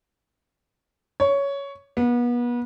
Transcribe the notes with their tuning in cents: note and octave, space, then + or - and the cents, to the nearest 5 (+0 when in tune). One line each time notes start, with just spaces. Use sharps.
C#5 +10
B3 -35